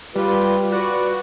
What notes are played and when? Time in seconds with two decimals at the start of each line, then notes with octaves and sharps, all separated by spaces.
0.16 G3 F4 G4 B4
0.72 F#4 B4 D5